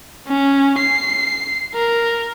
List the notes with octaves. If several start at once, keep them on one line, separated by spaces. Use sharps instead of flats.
C#4
C7
A#4